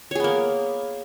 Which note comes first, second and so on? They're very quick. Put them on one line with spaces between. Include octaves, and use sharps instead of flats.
C#5 G#4 B3 A#3